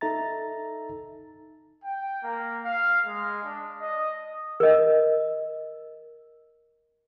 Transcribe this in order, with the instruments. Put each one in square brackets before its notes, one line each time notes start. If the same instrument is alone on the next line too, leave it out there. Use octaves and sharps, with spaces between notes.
[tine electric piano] D#4 A4 E5 A#5 A6
[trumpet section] G5
A#3
F5
G#3
D4
D#5
[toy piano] A#4 D#5